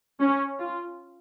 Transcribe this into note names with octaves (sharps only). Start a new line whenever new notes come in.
C#4
F4